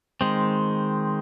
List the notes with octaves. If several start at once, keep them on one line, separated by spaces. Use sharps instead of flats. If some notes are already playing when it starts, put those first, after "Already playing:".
D#3 G#3 C4